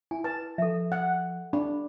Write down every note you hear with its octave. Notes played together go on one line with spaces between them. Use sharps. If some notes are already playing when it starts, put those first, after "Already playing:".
E4 G#5
B4 A5
F3 A4 E5
F#5
D4 B5